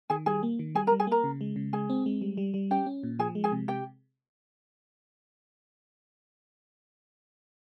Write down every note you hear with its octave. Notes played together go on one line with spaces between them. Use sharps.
D#3 G#4 G#5
G3 G#4 G#5
A#3
D#3
G3 G#4 G#5
A#4 A#5
G3
G#4 G#5
A#3 A#4 A#5
C#3
G#3
C#3
G#3 G#4 G#5
C4
G#3
G3
G3
G3
C#4 G4 G5
C#4
A#2
F3 G#4 G#5
G#3
G#4 G#5
C3
C3 G4 G5